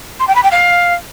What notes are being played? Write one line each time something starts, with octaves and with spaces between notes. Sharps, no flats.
C6
G5
B5
G5
F5